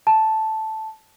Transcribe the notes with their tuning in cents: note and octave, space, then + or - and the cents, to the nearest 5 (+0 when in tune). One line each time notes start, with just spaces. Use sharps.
A5 -5